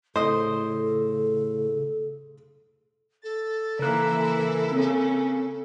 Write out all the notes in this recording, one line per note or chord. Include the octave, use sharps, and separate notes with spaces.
A2 C#3 A4 C5 D#5
A4 A6
C#3 E3 A#3 E4 A#4 E5 F#6
C#3 C4 C#4